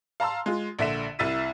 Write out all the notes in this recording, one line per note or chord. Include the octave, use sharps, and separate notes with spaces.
F5 A5 A#5 C6 E6
G#3 F4
A#1 D3 E5 B6 E7
C2 E4 E6 A6 B6 D#7